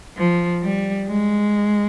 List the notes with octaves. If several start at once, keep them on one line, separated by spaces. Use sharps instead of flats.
F3
G3
G#3